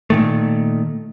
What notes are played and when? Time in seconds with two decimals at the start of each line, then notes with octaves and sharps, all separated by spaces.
0.10 A#2 D#3 A3